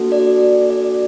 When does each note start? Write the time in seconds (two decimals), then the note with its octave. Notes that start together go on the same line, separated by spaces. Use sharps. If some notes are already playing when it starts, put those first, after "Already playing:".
Already playing: A#3 D4 F#4 A4
0.12 D5
0.70 D5